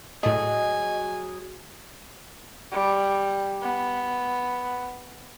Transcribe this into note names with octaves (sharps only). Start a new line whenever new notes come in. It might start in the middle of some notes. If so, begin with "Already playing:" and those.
A2 F#3 A3 G#4 D#5 G#5
G3
B3